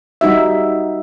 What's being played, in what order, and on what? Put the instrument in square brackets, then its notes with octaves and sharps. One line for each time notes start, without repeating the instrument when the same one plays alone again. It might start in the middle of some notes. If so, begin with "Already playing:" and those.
[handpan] G3 D#4 F#4 E5